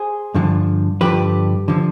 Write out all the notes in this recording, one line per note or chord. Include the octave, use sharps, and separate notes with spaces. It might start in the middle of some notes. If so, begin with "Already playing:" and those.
Already playing: G#4 C5
G2 D3 F3
G2 D3 F3 G4 B4
D3 F3